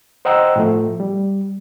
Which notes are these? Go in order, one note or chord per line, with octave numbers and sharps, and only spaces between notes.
C5 D#5 F#5 G5 A#5 E6
A2 F3 A3
G3